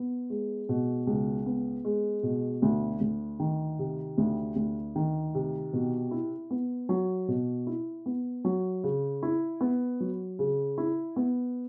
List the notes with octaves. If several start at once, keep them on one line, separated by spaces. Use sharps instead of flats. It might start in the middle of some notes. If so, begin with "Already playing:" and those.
Already playing: B3
G#3
B2
C#2
B3
G#3
B2
D2
D2
D#3
C3
D2
D2
D#3
C3
B2
E4
B3
F#3
B2
E4
B3
F#3
C#3
E4
B3
F#3
C#3
E4
B3